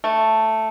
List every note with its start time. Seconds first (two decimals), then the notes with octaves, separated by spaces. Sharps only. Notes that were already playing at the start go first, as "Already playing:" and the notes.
0.04 A3